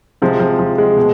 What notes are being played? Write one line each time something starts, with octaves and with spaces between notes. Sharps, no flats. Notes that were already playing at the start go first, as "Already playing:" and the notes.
C3 F3 G#3
F3
F3
G#3
B2